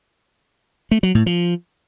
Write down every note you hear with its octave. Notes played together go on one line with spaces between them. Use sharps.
A3
F#3
A2
F3